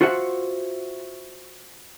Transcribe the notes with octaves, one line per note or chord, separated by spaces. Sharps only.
F4 F#4 C5 E5 F#5